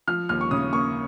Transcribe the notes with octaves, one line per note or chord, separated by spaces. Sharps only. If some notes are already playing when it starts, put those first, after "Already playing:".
F3 F6
D#2 F6
C#6
C#3 D#6
A#3 C#6